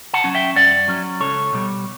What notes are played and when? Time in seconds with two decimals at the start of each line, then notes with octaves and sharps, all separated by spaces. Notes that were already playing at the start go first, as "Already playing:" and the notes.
0.14 F#5 A5
0.24 F#3 C#4
0.35 E5 G5
0.56 G2 D5 F#5
0.88 F#3 C#4
1.20 C#2 A4 C#5
1.53 B2 G3